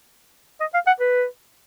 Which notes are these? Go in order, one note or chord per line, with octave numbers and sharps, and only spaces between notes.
D#5
F5
F#5
B4